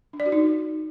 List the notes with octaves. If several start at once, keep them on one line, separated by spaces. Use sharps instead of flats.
D4
D5
F#4
D#4